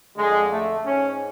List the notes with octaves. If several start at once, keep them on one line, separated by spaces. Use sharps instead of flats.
F2 D3 G#3
A3
G#2 C#4